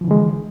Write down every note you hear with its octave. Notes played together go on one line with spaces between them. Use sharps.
D3 E3 F3 G#3